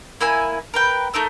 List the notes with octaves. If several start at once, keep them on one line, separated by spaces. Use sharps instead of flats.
A#3 E4 E5 G#5
A#4 B4 G5
A3 D#4 A#4 E6